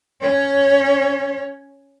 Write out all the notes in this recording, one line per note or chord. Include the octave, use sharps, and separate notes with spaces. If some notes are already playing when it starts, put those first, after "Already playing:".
C#4 C#5